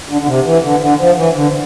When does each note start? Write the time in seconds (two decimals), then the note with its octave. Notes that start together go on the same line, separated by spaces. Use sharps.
0.09 D3
0.21 D3
0.27 C3
0.45 E3
0.63 D3
0.81 D3
0.99 F3
1.16 E3
1.35 D3